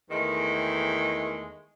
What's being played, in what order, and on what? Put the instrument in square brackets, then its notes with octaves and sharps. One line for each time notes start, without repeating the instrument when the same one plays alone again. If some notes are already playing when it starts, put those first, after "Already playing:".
[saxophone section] E2 D#3 G#3 A3